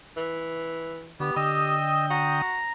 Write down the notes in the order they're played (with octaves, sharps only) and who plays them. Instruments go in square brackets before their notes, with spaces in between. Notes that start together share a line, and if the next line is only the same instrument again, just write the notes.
[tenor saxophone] E3
[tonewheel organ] D3 [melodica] B3 [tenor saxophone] G4
[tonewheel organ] D3 G5 D#6 [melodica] D#5 E6
[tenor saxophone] F#4 [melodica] A#5